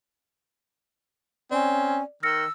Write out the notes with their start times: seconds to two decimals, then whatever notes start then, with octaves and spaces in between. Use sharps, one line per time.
1.51 C4 C#4 D5
2.23 D#3 E6 F6 A#6 C#7